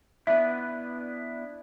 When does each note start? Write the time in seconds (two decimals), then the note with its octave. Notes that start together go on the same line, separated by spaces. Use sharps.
0.27 B3 D4 E4 E5